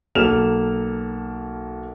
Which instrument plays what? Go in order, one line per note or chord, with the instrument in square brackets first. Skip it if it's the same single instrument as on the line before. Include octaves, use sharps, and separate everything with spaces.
[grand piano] B1 A#3 A4 F6 E7 F7